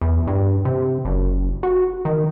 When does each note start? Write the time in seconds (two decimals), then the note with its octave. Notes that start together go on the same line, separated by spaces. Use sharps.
0.01 E2
0.27 G2
0.65 C3
1.05 F#1
1.63 F#4
2.05 D#3